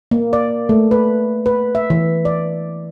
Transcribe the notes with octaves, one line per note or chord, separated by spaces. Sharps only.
A#3
D5
A3
B4
B4
E5
E3
D5